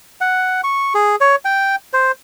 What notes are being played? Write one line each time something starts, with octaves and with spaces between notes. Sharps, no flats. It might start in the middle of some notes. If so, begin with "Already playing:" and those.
F#5
C#6
G#4
C#5
G5
C5